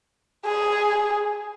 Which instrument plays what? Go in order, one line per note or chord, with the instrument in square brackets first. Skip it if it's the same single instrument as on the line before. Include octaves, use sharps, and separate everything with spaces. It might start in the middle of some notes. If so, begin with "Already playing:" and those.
[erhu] G#4